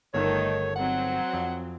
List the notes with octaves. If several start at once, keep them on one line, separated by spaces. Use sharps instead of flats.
G1 D#3 A3 D#4 A4 C#5
F#3 C4 F#5
F2